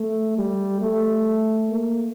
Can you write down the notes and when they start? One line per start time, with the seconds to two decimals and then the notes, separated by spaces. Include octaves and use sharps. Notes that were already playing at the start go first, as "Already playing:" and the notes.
Already playing: A3
0.38 G3
0.81 A3
1.70 A#3